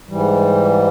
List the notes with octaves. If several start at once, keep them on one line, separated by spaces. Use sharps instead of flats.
G#2 E3 G3